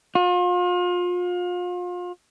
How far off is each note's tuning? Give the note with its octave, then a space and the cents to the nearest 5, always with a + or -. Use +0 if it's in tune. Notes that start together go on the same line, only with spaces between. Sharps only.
F4 +35